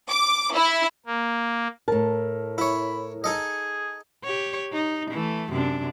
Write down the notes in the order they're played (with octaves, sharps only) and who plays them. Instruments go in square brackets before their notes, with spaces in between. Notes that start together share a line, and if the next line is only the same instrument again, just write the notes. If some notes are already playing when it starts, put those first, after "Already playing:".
[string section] D6
E4
[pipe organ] A#3
[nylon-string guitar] A2 A5 [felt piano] A#4
[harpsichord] E4 C#5 [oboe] B5
[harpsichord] D#4 A4 D#5 [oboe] G#4
[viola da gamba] G4 C#5
D#4
E3 A3
F#2 C3 D4